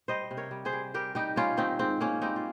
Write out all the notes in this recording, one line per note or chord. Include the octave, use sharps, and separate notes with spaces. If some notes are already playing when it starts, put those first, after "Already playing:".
G3 C5 D#5
C3
A#4 C#5
G3
G#4 C5
G3
G3 G4 A#4
G3 D#4 G4
G3 C#4 F4
D#3 C4 D#4
G#2 C4
G#2 A#3 C#4
G3 C4 D#4
F4